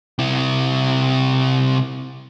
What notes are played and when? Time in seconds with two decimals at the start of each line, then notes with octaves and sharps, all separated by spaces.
0.19 C3 E4